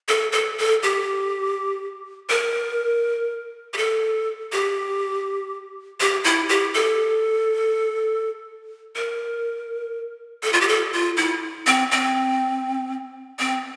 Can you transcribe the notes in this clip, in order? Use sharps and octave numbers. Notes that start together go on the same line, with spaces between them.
A4
A4
A4
G4
A#4
G4
A4
G4
G4
E4
G4
A4
A#4
A4
F4
G4
A4
F4
E4
C4
C4
C4